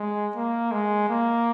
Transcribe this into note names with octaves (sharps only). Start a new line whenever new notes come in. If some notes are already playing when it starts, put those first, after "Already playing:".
Already playing: G#3
A#3
G#3
A#3